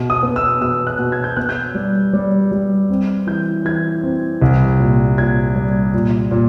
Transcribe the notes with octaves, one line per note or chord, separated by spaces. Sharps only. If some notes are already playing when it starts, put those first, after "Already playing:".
Already playing: B2
D#6
B3
E6
B2 E6
F#6
B2
G#6
G6
B3 F#6
G6
G3
G3
G3
C4
E3 G6
E3 G#6
C4
C2
A#2
A#2 G#6
G3
A#2
A#2